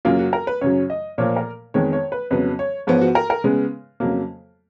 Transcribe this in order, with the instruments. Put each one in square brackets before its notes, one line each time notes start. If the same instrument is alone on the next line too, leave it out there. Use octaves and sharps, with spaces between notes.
[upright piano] F#2 C#3 F#3 A#3 F4
F#4
A#4
B4
F#2 C#3 F#3 C#5
D#5
A#2 F3 A#3 C#5
A#4
F2 D#3 G#3 B3 C#5
C#5
B4
F2 C#3 F#3 B3 B4
C#5
G#2 F3 B3 C#5
F#4
A#4
A#4
C#3 G#3 B3
F2 C#3 F#3 A#3